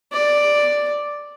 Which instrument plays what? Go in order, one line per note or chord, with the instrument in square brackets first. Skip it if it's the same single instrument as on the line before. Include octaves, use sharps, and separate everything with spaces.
[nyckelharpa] D5